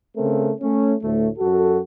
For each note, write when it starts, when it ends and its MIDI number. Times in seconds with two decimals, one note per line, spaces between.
0.17 0.53 49
0.17 0.53 57
0.17 0.53 60
0.17 0.53 70
0.61 0.94 57
0.61 0.94 61
1.02 1.29 38
1.02 1.29 45
1.02 1.29 57
1.38 1.80 42
1.38 1.80 66
1.38 1.80 69